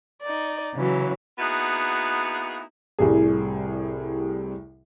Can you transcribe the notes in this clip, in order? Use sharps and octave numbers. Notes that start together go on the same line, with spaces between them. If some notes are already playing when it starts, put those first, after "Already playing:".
D#4 D5
C#3 E3 F#3
A#3 B3 D#4 E4 F#4 G#4
C2 A2 C3 G3 G#4